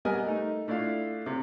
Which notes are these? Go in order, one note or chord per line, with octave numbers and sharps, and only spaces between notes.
G3 B3 A#4 D#5 G#5 F6
A3 D#4
A3 D4 E4 F4 F5
C3